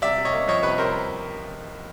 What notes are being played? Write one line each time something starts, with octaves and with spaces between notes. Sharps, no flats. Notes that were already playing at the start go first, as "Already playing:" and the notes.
C3 D5 E5
C3
C#5 D#5
A#3
F3 C#5 D#5
C3 B4 C#5
C3 A#4 C5